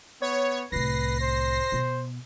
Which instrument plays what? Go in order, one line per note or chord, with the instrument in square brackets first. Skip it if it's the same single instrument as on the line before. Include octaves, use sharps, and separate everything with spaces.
[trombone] B3 [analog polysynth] C#5
[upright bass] C2 A2 [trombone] B4 [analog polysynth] A#6 C7
[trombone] C5
[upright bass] B2